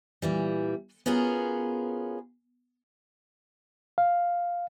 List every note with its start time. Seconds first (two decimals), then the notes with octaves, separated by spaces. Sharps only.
0.22 A#2 E3 G3
1.06 B3 C#4 F4 F#4 G#4 A#4
3.98 F5